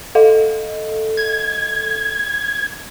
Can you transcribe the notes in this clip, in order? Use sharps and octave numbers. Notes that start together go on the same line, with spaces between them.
A4 D#5 F5
G#6